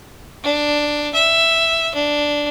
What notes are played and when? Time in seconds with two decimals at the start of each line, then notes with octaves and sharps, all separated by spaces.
0.43 D4
1.14 E5
1.94 D4